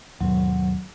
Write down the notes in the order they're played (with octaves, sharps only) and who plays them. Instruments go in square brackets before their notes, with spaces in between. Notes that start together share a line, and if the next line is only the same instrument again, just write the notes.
[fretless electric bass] D#2 G#2 B2 [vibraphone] F#3